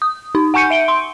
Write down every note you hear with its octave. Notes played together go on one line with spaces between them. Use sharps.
D#6
D#4
F#5 G#5 C#6 G6 C#7 D#7
E5 D7 G7
C6